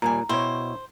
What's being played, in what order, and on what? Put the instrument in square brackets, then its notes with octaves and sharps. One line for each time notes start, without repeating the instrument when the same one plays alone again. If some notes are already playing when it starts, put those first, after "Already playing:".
[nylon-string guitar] D#2 G3 G#5 [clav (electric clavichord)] A#2 [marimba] A#5
[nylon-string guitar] B2 G5 [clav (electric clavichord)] E4 C#5 [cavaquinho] C5